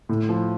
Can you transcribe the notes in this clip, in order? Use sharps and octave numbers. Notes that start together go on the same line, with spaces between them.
A2
F3